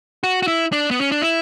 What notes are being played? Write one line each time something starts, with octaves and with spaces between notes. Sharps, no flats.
F#4
F#4
E4
D4
B3
C#4
D4
E4